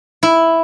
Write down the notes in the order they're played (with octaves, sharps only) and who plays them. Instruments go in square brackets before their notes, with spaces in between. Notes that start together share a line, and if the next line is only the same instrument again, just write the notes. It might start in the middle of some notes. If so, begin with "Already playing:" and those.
[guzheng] E4